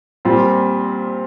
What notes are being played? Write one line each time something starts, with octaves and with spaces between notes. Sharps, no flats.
A#2 G3 C4 F4